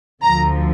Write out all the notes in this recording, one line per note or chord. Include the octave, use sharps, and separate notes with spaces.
D2 D3 F3 A#5